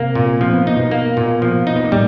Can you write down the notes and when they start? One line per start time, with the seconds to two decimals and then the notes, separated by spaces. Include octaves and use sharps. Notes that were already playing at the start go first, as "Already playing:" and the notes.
Already playing: C3 A#3 C4
0.15 A#2
0.41 F3 C4
0.53 B3
0.66 A#3 D#4
0.77 B2 B3
0.91 A#3
1.17 A#2
1.42 F3
1.67 D#4
1.76 B3
1.84 A#3
1.92 A2 G3